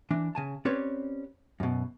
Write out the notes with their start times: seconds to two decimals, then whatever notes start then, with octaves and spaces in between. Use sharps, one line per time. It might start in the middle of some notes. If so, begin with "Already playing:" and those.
0.10 E3 D4
0.35 C#3 G#5 A5
0.65 C4 C#4 G4 B4 C#5 D5
1.60 F#2 B2